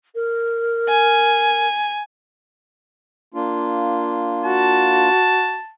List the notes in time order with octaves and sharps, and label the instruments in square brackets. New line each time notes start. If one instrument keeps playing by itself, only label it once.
[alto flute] A#4
[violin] G#5
[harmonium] A#3 D4 F4
[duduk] F#4 [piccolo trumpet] A5